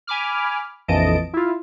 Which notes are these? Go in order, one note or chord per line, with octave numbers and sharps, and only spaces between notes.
G#5 B5 D6 F6
A#1 F2 E3 D#5 A5 D7
E4 F4